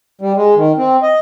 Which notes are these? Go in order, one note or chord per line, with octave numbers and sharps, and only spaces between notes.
G3
G#3
D#3
C4
D#5